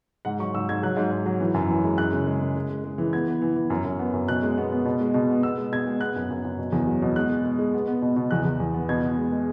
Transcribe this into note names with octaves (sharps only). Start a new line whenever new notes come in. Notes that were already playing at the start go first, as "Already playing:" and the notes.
G#2 F#5
F#3 C#6
G#2 E6
G#2 G#6
F#3 F#6
G#2
G#2
F#3
E3
F#2
E3
G#3
F#2 F#6
C#3
G#3
C#3
G#3
G#3
G#3
E3
B3 G#6
B3
E3
E3
F#2
F#2
B3
F#2
B2 F#6
G#3
B3
B3
B2
G#3
B2
B3
B3 E6
G#3
B2 G#6
G#3
B3 F#6
F#2
F#2
F#2
B2
E2
F#3
B2
G#3 F#6
G#3
G#3
G#3
B3
B3
B2
B2
E2 F#6
E2
E2
B3
B2 G#6
B2
G#3
G#3